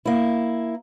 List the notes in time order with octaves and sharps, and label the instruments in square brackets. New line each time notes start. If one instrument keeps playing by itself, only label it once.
[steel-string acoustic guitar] A#3 E4